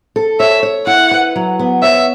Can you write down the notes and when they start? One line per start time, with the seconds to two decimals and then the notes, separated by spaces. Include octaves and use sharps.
0.16 A4
0.40 C#5 E5
0.63 C#5
0.87 E4 F#5
1.11 B4
1.36 F#3
1.59 B3
1.83 C#5 E5